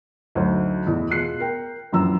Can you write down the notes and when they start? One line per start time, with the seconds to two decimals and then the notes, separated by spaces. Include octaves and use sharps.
0.35 D2 F#3 D#4 C5
0.87 E2 B2 E3
1.10 B2 F4 G#4 F#6 C7 C#7
1.40 A#4 G5
1.92 A#1 F#2 E3 A#5 E6